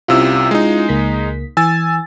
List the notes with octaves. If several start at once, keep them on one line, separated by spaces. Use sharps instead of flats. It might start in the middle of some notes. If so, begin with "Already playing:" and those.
C2 C3 C#4 E4 F4 E6
G#3 D#4
C#2 A#3 B6
E3 G#5 E6 A6